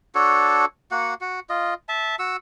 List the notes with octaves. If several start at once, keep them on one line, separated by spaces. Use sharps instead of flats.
D4 F#4 A4 C#5
A#3 F#4 F#5
F#4
F4 D#5
E5 A5
F#4 E6